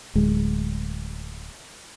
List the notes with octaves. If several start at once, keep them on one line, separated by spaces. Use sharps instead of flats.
D1 G#3